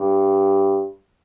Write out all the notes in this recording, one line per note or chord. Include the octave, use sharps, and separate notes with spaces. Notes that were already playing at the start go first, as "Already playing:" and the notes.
Already playing: G2